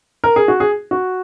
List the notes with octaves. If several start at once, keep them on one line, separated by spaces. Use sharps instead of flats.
A#4
G#4
F#4
G#4
F#4